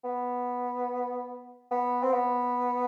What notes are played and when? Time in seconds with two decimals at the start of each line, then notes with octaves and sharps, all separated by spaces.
0.04 B3
1.71 B3
2.03 C4
2.13 B3